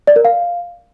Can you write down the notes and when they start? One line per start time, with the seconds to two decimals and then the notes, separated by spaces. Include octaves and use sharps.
0.07 D5
0.16 A#4
0.25 F5